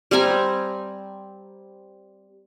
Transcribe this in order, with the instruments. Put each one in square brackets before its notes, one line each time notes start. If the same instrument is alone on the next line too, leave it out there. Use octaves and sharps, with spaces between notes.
[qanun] G3 C4 G#5 A#5